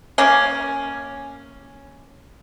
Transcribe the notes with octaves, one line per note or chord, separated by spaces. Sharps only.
A#3 C#4